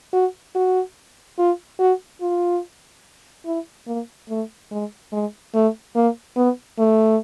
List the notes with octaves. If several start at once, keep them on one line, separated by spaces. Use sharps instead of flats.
F#4
F#4
F4
F#4
F4
E4
A#3
A3
G#3
G#3
A3
A#3
B3
A3